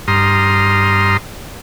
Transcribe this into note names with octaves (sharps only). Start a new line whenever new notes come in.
G2 A#5 C6 D#6 F6